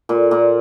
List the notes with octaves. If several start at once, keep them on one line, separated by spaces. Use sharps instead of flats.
A#2
A#2